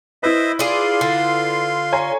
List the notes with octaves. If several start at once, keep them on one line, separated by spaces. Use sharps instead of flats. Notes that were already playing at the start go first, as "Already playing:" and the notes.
E4 B4 C5 D#5 E5
F4 G#4 D5 F5 C6
D3
C#5 G#5 A#5